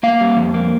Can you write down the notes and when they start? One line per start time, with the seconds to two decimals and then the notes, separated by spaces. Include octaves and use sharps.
0.03 A#3 F5
0.21 G3
0.37 F2
0.54 A#3